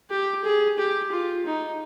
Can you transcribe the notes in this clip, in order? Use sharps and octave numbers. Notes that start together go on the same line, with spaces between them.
G4
G#4
G4
F4
D#4